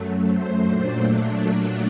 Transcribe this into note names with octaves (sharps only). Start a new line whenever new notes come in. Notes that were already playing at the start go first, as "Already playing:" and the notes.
Already playing: F#2 F#3 A3
C5
A#2 F#3 A3 D4